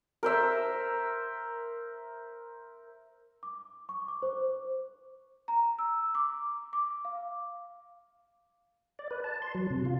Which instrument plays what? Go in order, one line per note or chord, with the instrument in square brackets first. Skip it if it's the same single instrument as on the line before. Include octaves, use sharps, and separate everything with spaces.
[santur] A#4 C5 E5
[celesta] D6
C#6
D6
C5
A#5
E6
D6
D6
F5
[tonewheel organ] D5
B4
A5
C6
F#3
C3
F4